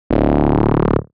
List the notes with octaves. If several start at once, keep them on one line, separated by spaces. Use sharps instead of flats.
D1